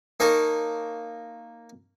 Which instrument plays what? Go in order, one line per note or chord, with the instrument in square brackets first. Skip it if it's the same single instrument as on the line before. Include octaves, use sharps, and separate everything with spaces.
[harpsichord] A#3 D#4 A#4 C#5 A5